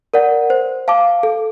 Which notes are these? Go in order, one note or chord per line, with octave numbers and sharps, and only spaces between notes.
A#4 D5 F#5
C5
F5 A5 D6
A4